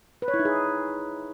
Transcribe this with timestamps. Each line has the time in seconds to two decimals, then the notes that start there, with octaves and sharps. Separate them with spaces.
0.22 B4
0.28 C#5
0.34 E4
0.39 D#4
0.45 G#4